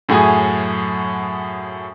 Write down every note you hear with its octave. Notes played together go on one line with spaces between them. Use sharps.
F#2 A2 F#3 G#4 G#5